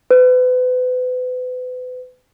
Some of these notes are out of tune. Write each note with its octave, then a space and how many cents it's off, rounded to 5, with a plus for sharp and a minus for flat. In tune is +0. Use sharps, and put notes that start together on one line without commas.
B4 +35